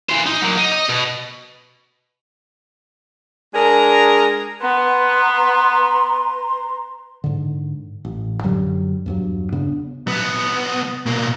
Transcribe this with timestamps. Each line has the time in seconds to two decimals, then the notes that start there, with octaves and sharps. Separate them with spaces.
0.10 E3 C5
0.26 D#4
0.41 F#3 A#3
0.57 D#4
0.72 D#5
0.89 B2
3.54 G#3 D4 G#4 A#4
4.61 B3 B4 A#5 C6
7.24 G#2 D3
8.05 A1
8.43 F#2 D3 F#3 G3
9.06 E2 G2 F#3
9.52 F1 C#3 B3 D4
10.07 C2 B3
11.06 B2 A#3